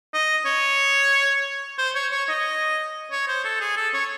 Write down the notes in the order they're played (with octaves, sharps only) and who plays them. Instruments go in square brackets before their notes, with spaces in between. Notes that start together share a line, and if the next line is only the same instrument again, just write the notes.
[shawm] D#5
C#5
C5
C#5
C#5
D#5
C#5
C5
A4
G#4
A4
C#5